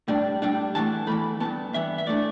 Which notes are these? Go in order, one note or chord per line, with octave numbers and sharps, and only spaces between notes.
A2 G3 D4
A2 G3 D4
E2 E3 A3 A5
E2 E3 A3 B5
G2 E3 B3 A5
G2 E3 B3 E5
E5
A2 A3 D4 D5